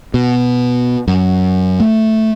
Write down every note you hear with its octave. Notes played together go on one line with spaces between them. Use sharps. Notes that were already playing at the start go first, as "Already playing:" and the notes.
B2
F#2
A3